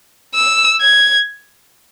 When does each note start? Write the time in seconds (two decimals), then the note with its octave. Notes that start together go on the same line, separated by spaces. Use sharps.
0.35 E6
0.81 G#6